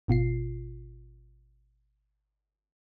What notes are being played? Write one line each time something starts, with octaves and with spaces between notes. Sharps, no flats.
G#1 B2 F4 C7